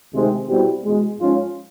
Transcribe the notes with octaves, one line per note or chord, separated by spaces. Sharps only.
D2 C3 D#3 G#3 C4
B2 G3 C4 E4 G4
E2 B2 G#3
G#2 F3 G#3 C#4 F4